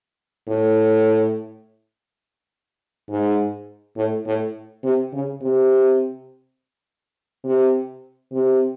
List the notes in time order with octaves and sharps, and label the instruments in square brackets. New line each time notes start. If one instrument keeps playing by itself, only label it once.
[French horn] A2
G#2
A2
A2
C3
C#3
C3
C3
C3